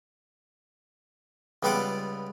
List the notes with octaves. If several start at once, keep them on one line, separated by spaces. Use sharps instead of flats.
C#2 G3 B3 F4 F#5 D6